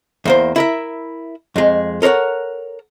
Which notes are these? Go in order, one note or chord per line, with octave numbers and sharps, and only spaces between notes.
E2 A#3 C5
E4 A#4 E5
F2 G#3
A4 A#4 C5 C#5 F#5